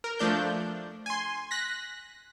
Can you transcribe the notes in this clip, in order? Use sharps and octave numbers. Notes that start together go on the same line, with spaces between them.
A#4
F3 A3 D4 G6
G#5 C6
F#6 A#6 B6